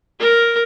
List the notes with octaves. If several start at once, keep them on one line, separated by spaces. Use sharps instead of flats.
A#4